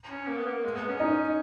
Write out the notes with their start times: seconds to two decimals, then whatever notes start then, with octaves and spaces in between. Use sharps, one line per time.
0.10 C#4
0.27 A#3
0.37 B3
0.47 A#3
0.65 G#3
0.76 B3
0.89 C#4
1.00 D#4 D#5